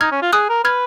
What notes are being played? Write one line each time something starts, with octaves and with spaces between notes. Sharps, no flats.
D#4 F6 G#6
C#4
F4
G#4 D#6 F#6
A#4
B4 F6 G#6